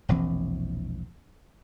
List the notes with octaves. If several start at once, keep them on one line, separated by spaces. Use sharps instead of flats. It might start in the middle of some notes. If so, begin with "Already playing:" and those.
E1 A#1 E3 C4